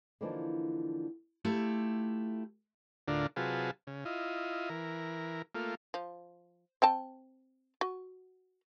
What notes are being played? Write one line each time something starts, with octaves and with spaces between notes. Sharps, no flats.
D3 E3 F3 A#3 D4 D#4
A3 E4 F4 G4
D2 A2 D3 D4 F4 A#4
C3 F#3 F4 G#4 B4 A5
C#3
E4 F4 D#5
E3 A#4
A3 A#3 F4
F3
C4 G5 A5
F#4